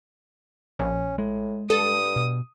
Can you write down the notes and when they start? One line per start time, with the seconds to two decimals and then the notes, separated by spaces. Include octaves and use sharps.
0.79 A#1 C#4
1.18 A2 G#3
1.70 G2 A4 D#6
2.16 B2